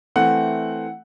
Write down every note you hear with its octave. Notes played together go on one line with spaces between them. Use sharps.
E3 A3 C4 F#5